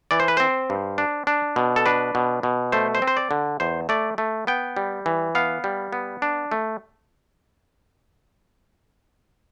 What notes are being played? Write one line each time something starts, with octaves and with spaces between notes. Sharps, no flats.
E3 D5
C5
B4
C4 C5
G2
D4
D4
B2
A4
D4 B4
B2
B2
A3 C5
C5
C4
C5
D5
D3
E2 C5
A3 D5
A3
B3 G5
G3
E3
B3 F5
G3
B3
D4
A3